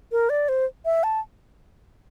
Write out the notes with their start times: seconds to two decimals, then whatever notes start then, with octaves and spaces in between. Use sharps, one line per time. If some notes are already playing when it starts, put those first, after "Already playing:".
0.12 A#4
0.30 D5
0.49 C5
0.85 E5
1.04 A5